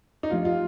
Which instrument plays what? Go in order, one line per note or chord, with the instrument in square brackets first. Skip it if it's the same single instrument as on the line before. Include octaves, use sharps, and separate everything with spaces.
[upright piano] D#4
[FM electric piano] F3 A3 D4 G4 [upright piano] F4
[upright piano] F4